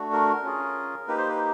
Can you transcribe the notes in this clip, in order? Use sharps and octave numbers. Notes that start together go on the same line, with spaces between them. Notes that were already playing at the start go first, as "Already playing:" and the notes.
Already playing: A3 D4 F#4
A#4
C#4 F4 G#4
A#3 D#4 G4 B4
C5
B4